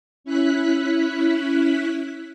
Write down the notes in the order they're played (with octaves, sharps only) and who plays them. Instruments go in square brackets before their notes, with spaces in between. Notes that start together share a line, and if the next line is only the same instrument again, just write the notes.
[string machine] C#4 E4 F#6 B6